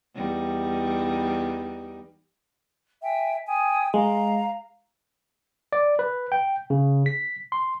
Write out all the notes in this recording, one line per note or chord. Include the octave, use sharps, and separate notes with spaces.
E2 G3 D#4
E5 G5 G#5
G5 G#5 D#6
G#3 F5 A#5
D5
B4
G5
C#3
B6
C6